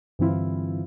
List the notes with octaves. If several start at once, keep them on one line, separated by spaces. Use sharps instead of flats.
G2 D3 E3 C4 E4 F4